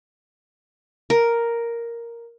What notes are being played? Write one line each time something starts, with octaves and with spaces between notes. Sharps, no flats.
A#4